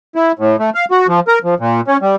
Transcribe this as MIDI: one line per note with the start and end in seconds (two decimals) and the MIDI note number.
0.15 0.32 64
0.39 0.56 45
0.59 0.70 57
0.75 0.85 77
0.91 1.07 66
1.08 1.20 53
1.28 1.39 70
1.44 1.54 53
1.60 1.81 46
1.88 1.97 61
2.01 2.16 55